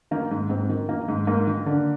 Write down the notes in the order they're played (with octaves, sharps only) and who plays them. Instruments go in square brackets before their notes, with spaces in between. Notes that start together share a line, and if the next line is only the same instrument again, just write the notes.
[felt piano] D#3 A#3
G#2
G#2 C4
D#3
D#3 A#3
G#2
G#2 A#3
D#3
D3